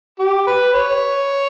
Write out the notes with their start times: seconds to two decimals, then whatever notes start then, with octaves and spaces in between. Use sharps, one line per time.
0.19 G4
0.47 B4
0.73 C#5